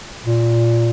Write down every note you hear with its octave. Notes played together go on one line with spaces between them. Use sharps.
A#2